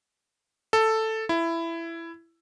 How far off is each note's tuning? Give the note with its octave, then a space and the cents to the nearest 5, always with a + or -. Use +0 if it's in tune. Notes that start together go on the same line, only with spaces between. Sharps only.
A4 +5
E4 +15